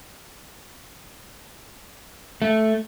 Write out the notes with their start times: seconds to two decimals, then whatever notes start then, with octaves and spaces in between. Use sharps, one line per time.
2.42 A3